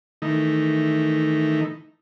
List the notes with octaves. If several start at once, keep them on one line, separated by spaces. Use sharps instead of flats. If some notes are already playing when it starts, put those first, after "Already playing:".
D#3 E3 A3 D#4